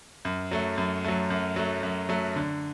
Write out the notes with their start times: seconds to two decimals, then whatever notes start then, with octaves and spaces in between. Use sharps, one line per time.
0.25 F#2
0.51 F#3 A3
0.78 F#2
1.04 F#3 A3
1.30 F#2
1.56 F#3 A3
1.83 F#2
2.09 F#3 A3
2.36 D3